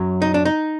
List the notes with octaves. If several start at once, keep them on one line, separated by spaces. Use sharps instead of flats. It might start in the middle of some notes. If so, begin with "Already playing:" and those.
Already playing: F#2 F#3
D#4
D4
D#4